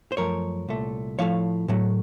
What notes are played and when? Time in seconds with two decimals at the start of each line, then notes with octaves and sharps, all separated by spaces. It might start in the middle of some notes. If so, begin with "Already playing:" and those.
0.12 C5
0.17 F#2 F3 A3 A#4 C#5
0.68 C2 A#2 A3
1.19 A2 F3 A3 C#5 F5
1.68 A2 F#3 A3